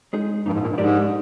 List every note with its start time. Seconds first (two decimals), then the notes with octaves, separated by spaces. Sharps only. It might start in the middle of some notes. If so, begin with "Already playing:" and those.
0.13 G#3 D#4 G#4
0.46 G2 F3 A#3 D#4
0.53 G#2
0.61 A#2
0.70 G2
0.78 G#2 G#3 D4 G4 A#4 D5